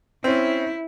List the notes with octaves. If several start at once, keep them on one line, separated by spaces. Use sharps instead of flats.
C4 C#4 E4